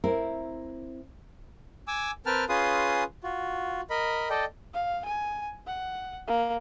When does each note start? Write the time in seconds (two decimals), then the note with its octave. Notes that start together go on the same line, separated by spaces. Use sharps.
0.04 C4 E4 A#4
1.88 G#5 D6 E6
2.26 C4 A#4 B4 G5 A5 F6
2.49 C#4 F4 G#4 B4 C6 D#6
3.24 F4 F#4
3.90 A#4 D#5 B5
4.30 A4 D5 D#5 G5
4.74 F5
5.05 G#5
5.67 F#5
6.28 A#3